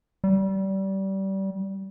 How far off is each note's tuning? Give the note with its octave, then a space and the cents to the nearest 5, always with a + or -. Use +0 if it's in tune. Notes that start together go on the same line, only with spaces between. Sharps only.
G3 -25